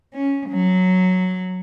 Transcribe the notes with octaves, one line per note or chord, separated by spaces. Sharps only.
C#4
F#3